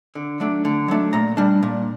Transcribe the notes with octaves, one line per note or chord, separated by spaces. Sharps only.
D3
F#3 A3 D4
D3
F#3 A3 D4
A#2 A#5
G3 D4
A#2